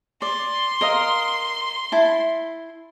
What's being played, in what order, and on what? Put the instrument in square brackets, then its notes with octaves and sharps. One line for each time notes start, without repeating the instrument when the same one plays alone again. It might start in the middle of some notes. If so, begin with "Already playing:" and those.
[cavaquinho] D5 [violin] C6
[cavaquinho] A#4 D#5 F5
E4 A5